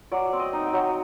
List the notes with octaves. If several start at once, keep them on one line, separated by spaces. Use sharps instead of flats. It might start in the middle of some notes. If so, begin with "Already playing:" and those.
F#3 D5
C4
D#5
D#4
G5
F#3